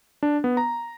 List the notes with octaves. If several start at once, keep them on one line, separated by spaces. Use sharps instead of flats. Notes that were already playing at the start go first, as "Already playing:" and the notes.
D4
B3
A#5